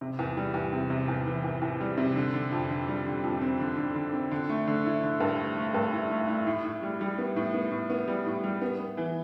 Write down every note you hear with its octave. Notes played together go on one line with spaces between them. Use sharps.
C3
E2
G3
E2
C3
C3
E2
E3
E2
E2
G3
C3
D3
D3
F2
D3
G3
D3
F2
C4
D3
D3
D3
C4
D3
A3
D3
E4
D3
G2
A3
A3
G2
E4
A3
E4
A2
A2
G3
G3
B3
A2
B3
A2
B3
G3
A2
G3
B3
B3
E3